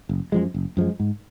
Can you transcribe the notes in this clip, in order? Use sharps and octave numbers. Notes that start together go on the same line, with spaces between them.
F#1
F#2 F3 G#3
F#1
F#2 F3 G#3
G#2